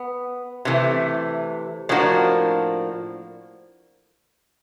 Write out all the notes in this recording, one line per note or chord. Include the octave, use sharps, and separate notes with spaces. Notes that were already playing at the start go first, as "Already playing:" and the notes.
Already playing: B3
C3 E3 A3
A2 F3 A#3 D4 F#4